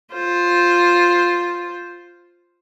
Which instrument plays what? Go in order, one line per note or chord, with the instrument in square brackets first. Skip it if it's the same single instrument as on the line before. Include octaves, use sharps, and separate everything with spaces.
[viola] F4 C5